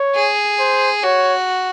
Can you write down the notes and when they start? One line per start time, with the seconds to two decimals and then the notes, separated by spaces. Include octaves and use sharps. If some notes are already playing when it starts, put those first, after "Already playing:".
Already playing: C#5
0.15 G#4
0.59 C5
1.04 F#4 C#5